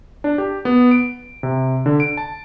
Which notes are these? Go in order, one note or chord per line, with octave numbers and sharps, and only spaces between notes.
D4
G4
B3
D7
C3
D3
D7
A5